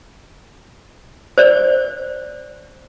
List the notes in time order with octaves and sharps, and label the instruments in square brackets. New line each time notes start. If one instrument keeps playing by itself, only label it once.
[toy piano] C5 D5